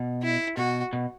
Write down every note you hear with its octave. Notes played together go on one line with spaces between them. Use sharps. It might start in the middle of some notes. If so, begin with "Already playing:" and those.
Already playing: B2
E4
B2 F#4
B2